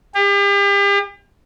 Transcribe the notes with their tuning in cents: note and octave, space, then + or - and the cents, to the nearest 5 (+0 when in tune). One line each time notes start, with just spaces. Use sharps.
G4 +40